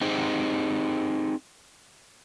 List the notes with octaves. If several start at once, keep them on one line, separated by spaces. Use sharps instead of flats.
C4 D#4 G4 G#4 C5